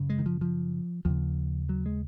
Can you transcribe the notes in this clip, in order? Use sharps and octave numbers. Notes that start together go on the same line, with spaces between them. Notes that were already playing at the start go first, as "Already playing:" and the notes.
Already playing: F#2 C#3
G#3
D#3
F3
F3
D#2 C#3 F3
F#3
G#3